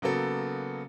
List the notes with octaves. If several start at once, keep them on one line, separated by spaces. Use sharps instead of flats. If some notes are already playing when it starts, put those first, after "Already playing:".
C#3 F#3 A#3 B3 A4